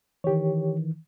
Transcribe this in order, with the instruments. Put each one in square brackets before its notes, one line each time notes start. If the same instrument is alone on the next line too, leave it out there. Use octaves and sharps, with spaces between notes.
[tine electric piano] D#3 E3 [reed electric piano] G4 C#5